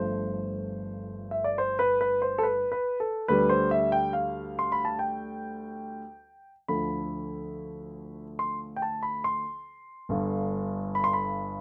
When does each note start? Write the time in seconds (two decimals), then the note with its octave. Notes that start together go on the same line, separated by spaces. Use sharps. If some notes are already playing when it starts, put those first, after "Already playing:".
Already playing: G1 G2 F3 A3 C5
1.31 E5
1.44 D5
1.58 C5
1.79 B4
2.01 B4
2.22 C5
2.38 A4
2.43 B4
2.72 B4
3.00 A4
3.28 D2 D3 G3 B4
3.49 C5
3.71 E5
3.92 G5
4.13 F5
4.59 C6
4.72 B5
4.85 A5
4.99 G5
6.68 D2 D3 F3 A3 B5
8.39 C6
8.76 G5
8.82 A5
9.03 B5
9.24 C6
10.09 G1 G2 D3
10.95 B5
11.04 C6
11.13 B5